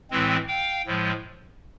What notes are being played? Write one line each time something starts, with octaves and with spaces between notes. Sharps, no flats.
A2 E3 G#3 C4
F5 G5
A2 F3 G#3